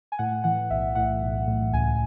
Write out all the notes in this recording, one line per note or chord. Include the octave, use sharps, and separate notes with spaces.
G#5
A2 F#5
E3 F#5
B1 E5
A2 F#5
B1
A2
C#2 G#5